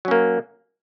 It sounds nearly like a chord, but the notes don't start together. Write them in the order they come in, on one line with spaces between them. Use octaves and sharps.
F#3 C#4 A#3